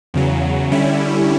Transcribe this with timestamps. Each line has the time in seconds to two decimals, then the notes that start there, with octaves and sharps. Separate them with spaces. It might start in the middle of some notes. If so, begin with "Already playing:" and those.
0.14 E2 C#3 F#3
0.72 D3 G3 C#4 E4